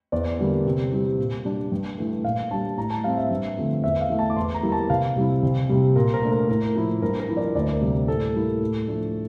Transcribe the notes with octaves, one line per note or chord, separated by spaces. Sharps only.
E2 D5
D3 G3 A#3
C3
E3 G3 C4
A#2
G3 D4
G2
E3 A3
A#2 F5
G3 D4 A5
A2 A#5
A5
G3 C4 F5
E5
G2
D3 F3 A3 C4
E2 E5
F5
E3 A3
A5
D6
E2 C6
A#5
E3 G3 A#3 E4
A5
C2 F5
C3 G3 C4 E4
C2
C3 G3
A#2 A#4
A#4
A3 D4
A#4
A2 A#4
F3 A#3 E4
G2 A#4
A#4
F3 A#3 E4
D5
D2 D5
A#4
C3 G3 A#3
A#4
A2 A4
G3 A#3 E4
A2
F3 A3 D4